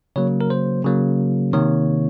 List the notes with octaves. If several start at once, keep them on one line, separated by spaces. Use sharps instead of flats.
C#3 F#3 A#3 C#5
A#4
C5
C#3 F#3 A#3
C3 D#3 A#3 C#5